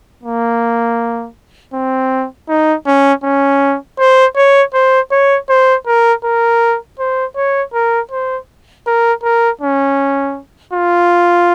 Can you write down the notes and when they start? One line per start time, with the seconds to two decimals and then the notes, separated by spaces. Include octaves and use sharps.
0.24 A#3
1.74 C4
2.49 D#4
2.87 C#4
3.24 C#4
3.99 C5
4.36 C#5
4.74 C5
5.11 C#5
5.49 C5
5.87 A#4
6.24 A#4
6.99 C5
7.36 C#5
7.74 A#4
8.11 C5
8.87 A#4
9.23 A#4
9.61 C#4
10.73 F4